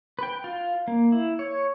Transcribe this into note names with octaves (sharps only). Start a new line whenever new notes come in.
B4 G5
F4
A#3
E4
C#5